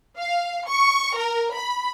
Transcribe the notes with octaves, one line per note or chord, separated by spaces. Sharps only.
F5
C#6
A#4
B5